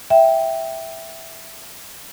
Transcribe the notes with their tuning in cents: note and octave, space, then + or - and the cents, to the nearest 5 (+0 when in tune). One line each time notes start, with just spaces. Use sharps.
E5 +0 G5 +0